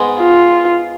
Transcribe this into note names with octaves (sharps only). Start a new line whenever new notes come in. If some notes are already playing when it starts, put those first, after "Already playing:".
Already playing: G#2 G#3 B3
F4